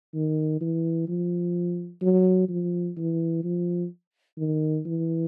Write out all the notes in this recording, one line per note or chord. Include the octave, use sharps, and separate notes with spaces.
D#3
E3
F3
F#3
F3
E3
F3
D#3
E3